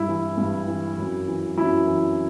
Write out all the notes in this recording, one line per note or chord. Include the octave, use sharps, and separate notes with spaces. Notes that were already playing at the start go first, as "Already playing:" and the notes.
Already playing: G2 E4
E3
G2
E3
F#2
E3
F#2 E4
E3